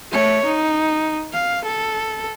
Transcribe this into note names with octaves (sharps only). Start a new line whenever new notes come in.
A3 C#5
D#4
F5
A4